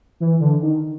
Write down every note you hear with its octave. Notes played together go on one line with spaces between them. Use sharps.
E3
D3
D#3